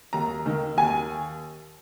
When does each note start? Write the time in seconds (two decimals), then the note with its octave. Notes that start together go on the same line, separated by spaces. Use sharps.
0.13 D#2 A#5
0.46 D#3
0.77 D#2 G#5